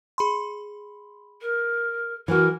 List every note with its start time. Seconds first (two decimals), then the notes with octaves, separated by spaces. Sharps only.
0.18 G#4 B5 C6
1.42 A#4
2.28 E3 F#4 A#4